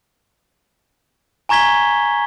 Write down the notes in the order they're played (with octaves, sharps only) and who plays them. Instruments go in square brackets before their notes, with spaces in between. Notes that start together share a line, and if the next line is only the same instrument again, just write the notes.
[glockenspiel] G#5 A#5 C#6 G#6 B6 G7